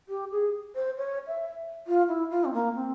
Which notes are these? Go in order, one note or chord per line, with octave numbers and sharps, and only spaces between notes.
G4
G#4
C5
C#5
E5
F4
E4
F4
C4
A#3
C4